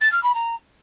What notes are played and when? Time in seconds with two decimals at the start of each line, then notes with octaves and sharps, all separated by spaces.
0.01 A6
0.12 F6
0.23 B5
0.34 A#5